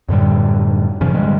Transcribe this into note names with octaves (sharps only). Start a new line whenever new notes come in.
F#2 A2 D3 G3
A#2 C#3 F3 C#4
G2 D3 G3 G#3